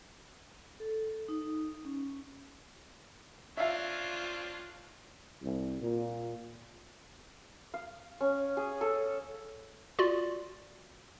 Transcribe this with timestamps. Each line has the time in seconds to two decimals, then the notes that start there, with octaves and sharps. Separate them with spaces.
0.80 A4
1.28 D#4
1.85 C#4
3.57 C4 D4 F4 C#5 E5 F5
5.41 C2
5.81 A#2
7.74 F5
8.21 C#4
8.57 G#4
8.81 A4
9.99 F4 F#4 D5